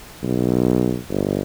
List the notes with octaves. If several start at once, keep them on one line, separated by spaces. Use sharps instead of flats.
B1
G1